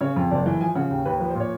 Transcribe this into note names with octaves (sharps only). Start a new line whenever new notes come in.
C#3 C#5
F2
F#1 D5
E3
F3 G#5
C#3 F#5
D#2
D#2 B4
F3 B4
C5
A#2 C#5